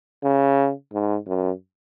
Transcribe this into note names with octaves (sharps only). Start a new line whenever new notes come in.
C#3
G#2
F#2